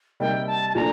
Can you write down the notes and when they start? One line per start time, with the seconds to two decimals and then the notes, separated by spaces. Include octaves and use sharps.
0.20 C3 G3 A#3 D#4 G5
0.47 A5
0.70 A5
0.75 A#2 F3 A3 D4 A#5